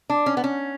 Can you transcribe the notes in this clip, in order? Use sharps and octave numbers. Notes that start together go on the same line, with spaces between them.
D4
C#4
B3
C#4